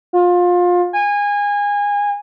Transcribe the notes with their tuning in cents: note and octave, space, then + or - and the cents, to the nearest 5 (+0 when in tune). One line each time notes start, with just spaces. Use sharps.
F4 +25
G#5 -25